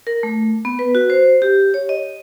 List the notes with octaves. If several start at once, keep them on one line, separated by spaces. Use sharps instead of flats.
A#4
A3
B3
B4
F#4
C5
G4
C#5
D#5